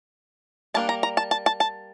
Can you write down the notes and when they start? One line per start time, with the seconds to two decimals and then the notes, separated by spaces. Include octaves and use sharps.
0.74 G3 A#3 D4 A5
0.89 A#5
1.03 A#5
1.17 A5
1.31 A5
1.46 A5
1.60 A5